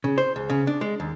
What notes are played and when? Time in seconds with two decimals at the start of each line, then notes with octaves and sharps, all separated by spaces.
0.04 C#3
0.18 C5
0.36 C#2
0.50 C#3
0.67 D4
0.81 G#3
1.00 D#2